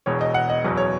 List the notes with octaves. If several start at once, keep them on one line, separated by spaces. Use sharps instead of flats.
E1 E2 B2 C#5
D#5
F#5
D#5
F#1 E2 B2 F#3
C#5